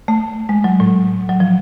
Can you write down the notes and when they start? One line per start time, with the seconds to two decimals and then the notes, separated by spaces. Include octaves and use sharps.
0.08 A3
0.49 G#3
0.64 F#3
0.80 A2
1.29 F#3
1.40 F3